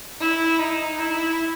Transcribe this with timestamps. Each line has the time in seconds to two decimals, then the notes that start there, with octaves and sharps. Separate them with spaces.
0.21 E4
0.59 D#4
0.99 E4